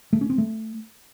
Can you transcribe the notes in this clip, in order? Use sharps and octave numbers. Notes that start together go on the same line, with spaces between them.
A3
C#4
C4
A3